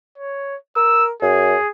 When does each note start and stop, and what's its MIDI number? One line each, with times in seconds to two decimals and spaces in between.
0.18 0.56 73
0.76 1.11 70
0.76 1.05 88
1.22 1.55 42
1.22 1.69 68